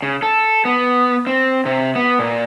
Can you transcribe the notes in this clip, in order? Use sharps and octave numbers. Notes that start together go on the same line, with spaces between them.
C#3
A4
B3
C4
C3
B3
A#2